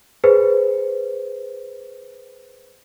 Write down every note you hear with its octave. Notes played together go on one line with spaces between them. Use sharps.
G#4 B4 C5